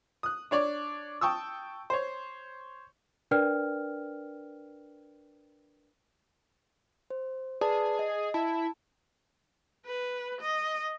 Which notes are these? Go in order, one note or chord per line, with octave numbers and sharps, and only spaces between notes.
D#6 F#6
D4 C#5 D5
G5 A5 C#6 D#6 E6
C5 C#5
D4 A#4 B4 D5 G5 F6
C5
G#4 B4 D5 A5
D#5
E4 A5
B4
D#5